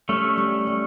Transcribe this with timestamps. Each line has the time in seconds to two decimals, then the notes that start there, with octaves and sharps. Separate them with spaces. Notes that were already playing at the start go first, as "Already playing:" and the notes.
0.09 G3 A3 C#4
0.38 G3
0.67 G3